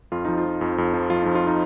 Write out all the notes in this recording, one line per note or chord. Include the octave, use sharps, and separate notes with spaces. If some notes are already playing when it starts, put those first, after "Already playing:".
F2 F4
F3 D#4
F4
F3
F2
F2
F3
F3 F4
F2 D#4
F4
D#4